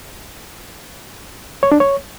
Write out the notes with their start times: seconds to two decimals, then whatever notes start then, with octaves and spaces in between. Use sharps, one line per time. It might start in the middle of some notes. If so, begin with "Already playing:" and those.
1.63 C#5
1.72 D4
1.80 C#5